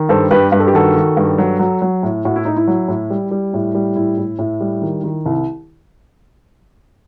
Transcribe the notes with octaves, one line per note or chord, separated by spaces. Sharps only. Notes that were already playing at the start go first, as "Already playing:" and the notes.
Already playing: D#3
G2 A4 C5
G2 G4 B4
G2 B4
A4
G4
D#3 F#4 A4
D#3
G2
F#3
F#3
F#3
A2
A2 F#4
E4
A2 D#4
E4
F#3
A2
G3
G3
A2
G3
A2 E4
A2
A2
G3
D#3
D#3
C2